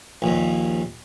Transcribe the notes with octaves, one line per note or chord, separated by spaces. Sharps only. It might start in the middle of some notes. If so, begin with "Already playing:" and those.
A#1 D#2